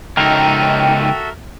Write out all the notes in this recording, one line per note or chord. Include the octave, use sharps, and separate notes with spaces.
C#2 D#4 F#4 A4 A#4 E5 G5